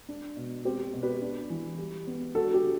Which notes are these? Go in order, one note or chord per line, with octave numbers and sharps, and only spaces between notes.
D4
B2
C4 G4
B2
G4 B4
D4
E3
G3
B3
D4 F#4 A4
G4
D3